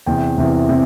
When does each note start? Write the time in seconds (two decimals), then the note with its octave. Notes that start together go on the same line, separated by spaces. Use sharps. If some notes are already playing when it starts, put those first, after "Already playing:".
0.06 E2 C3 E3 G5
0.38 E2 C3 E3
0.69 C3 E3